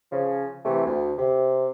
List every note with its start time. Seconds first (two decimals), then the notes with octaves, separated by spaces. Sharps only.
0.12 C#3 F3
0.65 C3 E3 A3
0.86 D2
1.18 C3